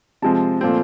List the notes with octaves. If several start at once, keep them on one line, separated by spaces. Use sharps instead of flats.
C3 F3 G#3 C4 A5
A#2 F3 A3 C4